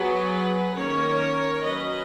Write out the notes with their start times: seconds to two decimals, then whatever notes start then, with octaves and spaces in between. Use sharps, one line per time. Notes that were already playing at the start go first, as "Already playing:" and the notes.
Already playing: F#3 B3 G#4 B4
0.76 D#3 A#3 C#4 A#4 C#5
1.64 F#3 C#4 B4 D#5